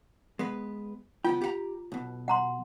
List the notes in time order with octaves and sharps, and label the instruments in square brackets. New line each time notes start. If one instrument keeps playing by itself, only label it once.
[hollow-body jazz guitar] G#3 B3 B4
[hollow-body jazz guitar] C#2 B3 G5 [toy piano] F4
[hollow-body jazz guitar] G4 F#5 A#5
B1 B2
[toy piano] F#5 A#5 C6